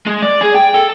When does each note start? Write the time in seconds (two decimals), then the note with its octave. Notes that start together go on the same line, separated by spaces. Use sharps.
0.07 G#3
0.23 D5
0.41 G#4
0.54 G5
0.74 A4